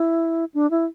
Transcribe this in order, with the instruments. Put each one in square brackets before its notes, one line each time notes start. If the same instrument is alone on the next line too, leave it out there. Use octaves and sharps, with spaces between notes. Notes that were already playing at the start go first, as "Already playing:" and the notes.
Already playing: [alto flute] E4
D4
E4